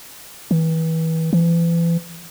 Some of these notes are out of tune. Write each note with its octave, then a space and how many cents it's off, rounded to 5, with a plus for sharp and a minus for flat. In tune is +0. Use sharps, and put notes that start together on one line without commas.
E3 -30
E3 +35